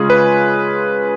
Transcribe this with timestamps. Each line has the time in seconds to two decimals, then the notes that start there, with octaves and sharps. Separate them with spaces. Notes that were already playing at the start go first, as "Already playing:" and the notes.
Already playing: C#3 G#3 C#4 F4 G#4
0.10 B4